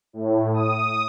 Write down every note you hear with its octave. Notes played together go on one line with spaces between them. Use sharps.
A2
D#6